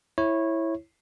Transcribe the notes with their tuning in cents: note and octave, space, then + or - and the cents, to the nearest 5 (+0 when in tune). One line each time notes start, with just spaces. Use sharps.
E4 +0 C#5 -20